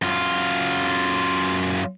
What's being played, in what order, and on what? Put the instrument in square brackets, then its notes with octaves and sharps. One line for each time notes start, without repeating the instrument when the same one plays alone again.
[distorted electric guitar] F#2 F4